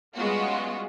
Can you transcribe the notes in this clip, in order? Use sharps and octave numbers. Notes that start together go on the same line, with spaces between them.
G3 G#3 B3 C#4 F4 F#4